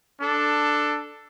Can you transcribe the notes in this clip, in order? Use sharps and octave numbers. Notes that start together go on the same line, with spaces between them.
D4 A4